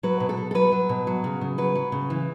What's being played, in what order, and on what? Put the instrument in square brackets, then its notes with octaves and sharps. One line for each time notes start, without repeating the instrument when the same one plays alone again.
[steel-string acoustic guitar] F#3 B4
B2
A4
B2
A4
F#3 B4
F#3
B2
F#3
C#3
C#3
F#3 B4
F#3
C#3
E3